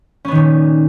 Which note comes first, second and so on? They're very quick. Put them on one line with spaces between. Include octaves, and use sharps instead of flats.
C#4 B3 D#3 A#2